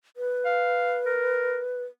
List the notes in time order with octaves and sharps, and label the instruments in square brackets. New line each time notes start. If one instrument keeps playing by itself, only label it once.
[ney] B4
[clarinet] F5
A#4